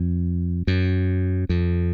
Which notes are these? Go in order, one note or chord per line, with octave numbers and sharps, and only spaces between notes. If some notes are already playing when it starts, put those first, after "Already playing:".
Already playing: F2
F#2
F2